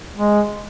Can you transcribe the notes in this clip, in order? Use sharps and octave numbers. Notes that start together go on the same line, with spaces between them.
G#3